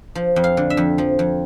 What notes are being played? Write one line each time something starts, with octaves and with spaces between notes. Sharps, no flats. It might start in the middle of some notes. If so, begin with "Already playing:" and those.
F3
F2
F5
D3
E5
F2
F3
F2